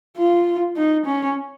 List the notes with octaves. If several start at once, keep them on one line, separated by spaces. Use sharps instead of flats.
F4
D#4
C#4